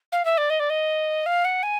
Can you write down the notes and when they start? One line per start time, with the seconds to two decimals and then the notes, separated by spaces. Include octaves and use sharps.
0.12 F5
0.25 E5
0.37 D5
0.50 D#5
0.60 D5
0.70 D#5
1.26 F5
1.45 F#5
1.63 G#5